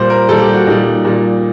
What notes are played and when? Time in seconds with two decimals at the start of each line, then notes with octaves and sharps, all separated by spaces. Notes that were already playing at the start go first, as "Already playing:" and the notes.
Already playing: A#2 G3 C5
0.10 A#4
0.29 A#2 G3 A4
0.41 G4
0.54 F#4
0.67 A#2 G3 D#4
1.05 A#2 G3